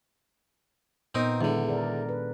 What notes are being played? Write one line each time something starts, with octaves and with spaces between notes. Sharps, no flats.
A#2 B3 C4 D#4 A#4
E2 D3 D#3 G#3 D4
A4 A#4 D5
B4